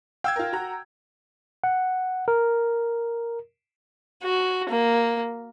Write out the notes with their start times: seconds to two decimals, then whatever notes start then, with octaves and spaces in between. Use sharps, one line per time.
0.24 F5 G5 E6 G#6
0.36 F4 A#4
0.53 F#4 A#5
1.64 F#5
2.28 A#4
4.24 F#4
4.69 A#3